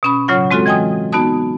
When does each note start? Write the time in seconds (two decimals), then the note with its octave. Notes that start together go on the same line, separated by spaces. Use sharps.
0.03 B2 C#4 B5
0.28 A2 C#3 F#3 F4 C#5 F#5
0.51 G#3 C4 F4 F#4 A4
0.66 E3 D#5 G5 G#5 D#6
1.12 B3 D#4 F#4 A5 D#6